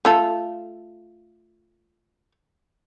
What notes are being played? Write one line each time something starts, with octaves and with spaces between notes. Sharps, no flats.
A3 F4 A4